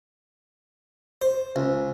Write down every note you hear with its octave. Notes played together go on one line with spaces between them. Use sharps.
C5
C#2